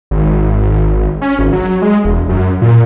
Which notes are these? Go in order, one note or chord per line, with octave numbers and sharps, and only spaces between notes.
G#1
C#4
G#1
F#3
G#3
E1
F#2
A#2